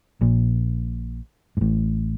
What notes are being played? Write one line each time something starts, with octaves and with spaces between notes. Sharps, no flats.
A#1 A#2
G#2
A1 A2